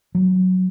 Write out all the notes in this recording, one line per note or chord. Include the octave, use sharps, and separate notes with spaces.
F#3